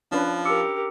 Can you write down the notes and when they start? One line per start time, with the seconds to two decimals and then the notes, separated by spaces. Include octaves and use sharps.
0.12 F3 C#4 D4 B4
0.45 G4 A#4 D6 E6 C#7